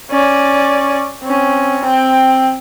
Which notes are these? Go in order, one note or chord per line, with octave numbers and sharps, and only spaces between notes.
C#4 D5
C4 C#4
C4 G5